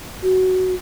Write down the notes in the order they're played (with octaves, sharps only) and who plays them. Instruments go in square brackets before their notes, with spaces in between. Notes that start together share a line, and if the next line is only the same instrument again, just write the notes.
[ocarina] F#4